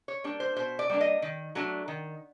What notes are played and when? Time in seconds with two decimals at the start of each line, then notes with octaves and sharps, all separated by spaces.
0.08 C#5
0.24 G3 A#3 D4
0.40 C5
0.57 B2 C5
0.79 D5
0.90 G3 A#3 D4
1.01 D#5
1.22 D#3
1.55 F#3 A3 D4
1.88 D#3